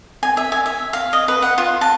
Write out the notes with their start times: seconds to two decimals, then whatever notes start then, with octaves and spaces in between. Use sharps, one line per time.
0.23 G#5
0.37 E5
0.52 G#5
0.66 E5
0.93 F5
1.13 D#5
1.28 B4
1.42 F#5
1.58 F4
1.81 A5